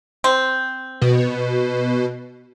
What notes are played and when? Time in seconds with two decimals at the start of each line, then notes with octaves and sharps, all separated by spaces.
0.24 C4
1.02 B2